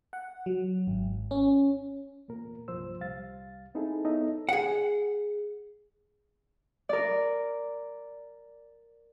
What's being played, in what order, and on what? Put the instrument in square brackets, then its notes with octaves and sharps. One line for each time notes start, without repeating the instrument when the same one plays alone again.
[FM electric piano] F#5
F#3
G#1
C#4
[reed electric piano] E2 A#2 A#3 A#4
C2 G2 A#2 F3 C5 E6
C2 G3 F5 A6
C4 D#4 E4 G#4 A4
B3 D#4 A4 C#5 D#5 E5
[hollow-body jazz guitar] G#4 F#5
[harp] A#4 D5